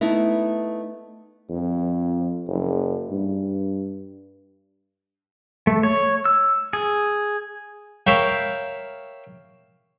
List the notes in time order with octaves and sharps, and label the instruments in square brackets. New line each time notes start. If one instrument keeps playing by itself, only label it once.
[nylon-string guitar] A3 B3 D#4 E4
[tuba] F2
F#1
G2
[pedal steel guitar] A3
C#5
E6
G#4
[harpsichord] A#4 C#5 E5 F5 G5 B5